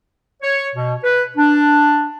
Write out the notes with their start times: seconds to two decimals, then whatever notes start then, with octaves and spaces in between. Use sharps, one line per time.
0.42 C#5
0.75 B2
1.04 B4
1.37 D4